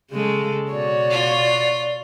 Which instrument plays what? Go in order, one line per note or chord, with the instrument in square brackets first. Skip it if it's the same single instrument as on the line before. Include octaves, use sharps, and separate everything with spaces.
[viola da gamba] C#3 G#3 A4
[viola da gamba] B2 F#4 C#5 [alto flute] D5
[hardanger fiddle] F4